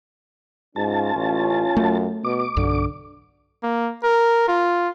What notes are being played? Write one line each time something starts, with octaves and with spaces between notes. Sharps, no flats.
G#2 C#4 F4 A5
A1
F#2 A3
B2 D6
B1 G2 D3
A#3
A#4
F4